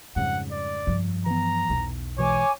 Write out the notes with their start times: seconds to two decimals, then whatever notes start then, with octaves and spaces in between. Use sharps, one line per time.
0.16 F2 G#2 C#3 G3 F#5
0.52 D5
0.87 G2 F3
1.26 E3 B3 A#5
1.69 B1 E2
2.18 B2 E3 G#3 C#5 G#5 D6